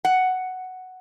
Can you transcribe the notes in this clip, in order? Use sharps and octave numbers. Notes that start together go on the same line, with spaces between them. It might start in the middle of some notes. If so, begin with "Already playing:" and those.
F#5